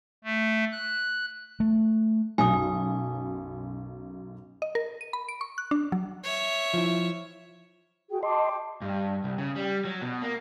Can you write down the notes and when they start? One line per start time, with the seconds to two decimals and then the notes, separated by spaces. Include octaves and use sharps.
0.24 A3
0.72 F#6
1.60 A3
2.38 B1 F#2 G#5 D#6
4.62 D#5
4.75 A#4
5.01 D#7
5.13 B5
5.29 D7
5.41 C#6
5.58 F#6
5.71 D4
5.92 F#3
6.24 C#5 E5
6.74 F3 E4
8.09 F#4 G#4 G5
8.23 D#5 G5 A5 C6 D6
8.82 G2
9.24 C2
9.38 C#3
9.56 G3
9.85 F#3
10.02 B2
10.22 A#3